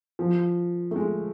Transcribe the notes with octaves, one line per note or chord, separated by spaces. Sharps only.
F3
A3
G#3